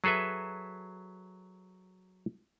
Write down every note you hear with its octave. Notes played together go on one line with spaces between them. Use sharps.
F#3 G#4 A4 B4 E5